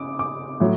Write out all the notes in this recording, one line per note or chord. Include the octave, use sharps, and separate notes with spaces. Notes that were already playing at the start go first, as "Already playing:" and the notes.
Already playing: C#3 D6 D#6
D6
A2 F#3